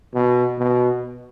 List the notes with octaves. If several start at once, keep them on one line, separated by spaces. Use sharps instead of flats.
B2
B2